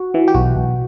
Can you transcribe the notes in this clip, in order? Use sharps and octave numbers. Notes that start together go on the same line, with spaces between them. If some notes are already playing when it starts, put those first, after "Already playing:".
Already playing: F#4
E3
G4
B1 F#4
B1